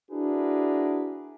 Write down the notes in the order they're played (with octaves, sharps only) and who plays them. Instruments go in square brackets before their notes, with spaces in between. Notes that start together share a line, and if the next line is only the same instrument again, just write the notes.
[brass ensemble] D4 E4 F#4 G#4 A#4 B4